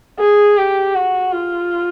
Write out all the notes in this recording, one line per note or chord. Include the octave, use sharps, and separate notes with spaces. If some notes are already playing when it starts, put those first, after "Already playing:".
G#4
G4
F#4
F4